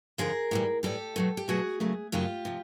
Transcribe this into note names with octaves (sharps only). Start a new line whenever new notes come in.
F2 D3 F3 G#4 A#4
A2 E3 G3
A2 E3 G3 G4 A4
B2 F#3 A3
G4
B2 F#3 A3 F#4 G#4
F#2 C#3 F#3 A3
F#2 C#3 F#3 A3 F4 G4
C3 F3